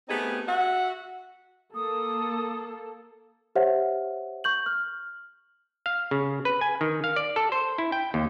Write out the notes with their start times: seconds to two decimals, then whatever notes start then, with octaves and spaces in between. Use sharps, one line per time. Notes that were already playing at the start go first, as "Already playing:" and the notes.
0.08 A3 B3 C4 D#4 G4 G#4
0.47 F#4 E5 F#5
1.75 A#3 A4 D#6
3.55 G4 C5 C#5 E5 F#5
4.44 C#6 G6 F#7
4.66 F6
5.86 F5
6.11 C#3
6.45 B4
6.61 G#5
6.81 D#3
7.04 F5
7.16 D5
7.36 A4
7.52 C5
7.78 E4
7.92 G5
8.14 D#2